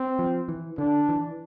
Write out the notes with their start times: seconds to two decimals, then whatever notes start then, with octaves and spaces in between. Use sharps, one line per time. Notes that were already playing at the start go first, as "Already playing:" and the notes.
Already playing: C4
0.19 F3
0.49 E3
0.78 D3 D4
1.09 E3